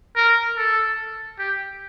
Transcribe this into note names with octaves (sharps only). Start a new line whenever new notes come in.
A#4
A4
G4